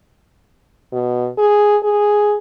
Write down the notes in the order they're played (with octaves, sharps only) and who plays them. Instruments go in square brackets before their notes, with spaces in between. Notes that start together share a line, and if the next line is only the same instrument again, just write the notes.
[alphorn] B2
G#4
G#4